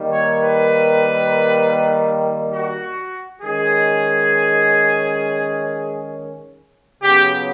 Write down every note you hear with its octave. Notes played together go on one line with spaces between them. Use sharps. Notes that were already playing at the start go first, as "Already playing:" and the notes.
Already playing: D#3 G3 A#3
C#5
B4
F#4
D#3 G#3 C#4 G#4
C#3 F#3 B3 G4